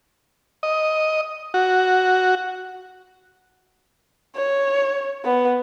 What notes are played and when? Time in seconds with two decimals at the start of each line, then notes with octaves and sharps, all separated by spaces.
0.63 D#5
1.54 F#4
4.36 C#5
5.25 B3